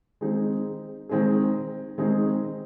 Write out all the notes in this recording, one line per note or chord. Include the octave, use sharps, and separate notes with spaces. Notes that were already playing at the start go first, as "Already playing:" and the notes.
D#3 G#3 C4 D#4 G#4
D#3 G#3 C4 D#4 G#4
D#3 G#3 C4 D#4 G#4